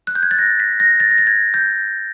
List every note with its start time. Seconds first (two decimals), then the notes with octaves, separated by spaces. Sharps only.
0.07 F#6
0.15 G6
0.23 G#6
0.31 A6
0.39 A#6
0.60 B6
0.80 A#6
1.00 A6
1.11 A#6
1.18 A6
1.27 G#6
1.54 G6